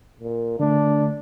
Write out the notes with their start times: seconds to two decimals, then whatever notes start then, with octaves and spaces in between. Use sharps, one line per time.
0.20 A#2
0.60 D3 A3 D4